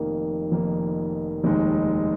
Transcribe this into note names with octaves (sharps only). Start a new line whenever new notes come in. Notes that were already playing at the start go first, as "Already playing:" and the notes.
Already playing: F1 F2 D#3 A#3
F1 F2 D#3 A#3
F1 D#2 D#3 G#3 D#4